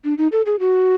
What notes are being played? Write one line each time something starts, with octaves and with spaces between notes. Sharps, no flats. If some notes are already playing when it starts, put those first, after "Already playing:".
D4
D#4
A4
G#4
F#4